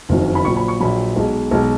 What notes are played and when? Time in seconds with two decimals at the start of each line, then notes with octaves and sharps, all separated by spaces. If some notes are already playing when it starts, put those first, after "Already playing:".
0.09 F#1 F2 D#3 F#3
0.35 B5
0.45 A#1 A#2 F#3 C#6
0.56 B5
0.68 C#6
0.80 A#1 A#2 F#3 B5
1.16 B1 B2 G#3
1.51 B1 B2 G#3